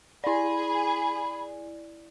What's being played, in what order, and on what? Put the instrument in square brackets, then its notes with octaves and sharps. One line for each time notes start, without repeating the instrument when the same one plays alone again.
[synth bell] E4 D5 [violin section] G#4 [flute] B5